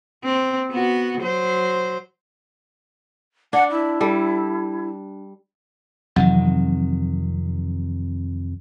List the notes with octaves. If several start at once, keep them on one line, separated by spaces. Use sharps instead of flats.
C4
B3 F#4
F#3 C5
D4 F#5
E4
G3 A4
F2 C3 D#3 E3 F#3